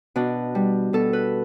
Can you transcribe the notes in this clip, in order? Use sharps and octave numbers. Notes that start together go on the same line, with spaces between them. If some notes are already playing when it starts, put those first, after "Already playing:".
B2 D4
G3
B2 A4
B4